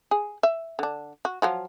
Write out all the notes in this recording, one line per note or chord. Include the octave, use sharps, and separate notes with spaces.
G#4
E5
D3 D4
F#4
F3 F#3 F4